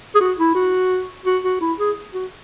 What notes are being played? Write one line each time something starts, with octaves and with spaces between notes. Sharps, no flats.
G#4
F#4
E4
F#4
F#4
F#4
E4
G#4
F#4